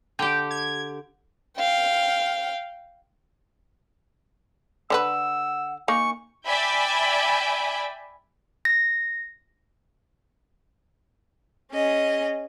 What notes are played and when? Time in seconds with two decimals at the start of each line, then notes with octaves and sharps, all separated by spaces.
0.19 D3 G4 G5
0.51 G#6
1.58 F5 G5
4.90 D3 C#4 B4 F#5 E6
5.88 A#3 D#4 G#5 C#6
6.46 D5 E5 G5 G#5 B5
8.65 A#6
11.72 C#4 G#4 D#5